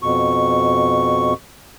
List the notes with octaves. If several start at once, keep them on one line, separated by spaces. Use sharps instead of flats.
F2 B2 C#6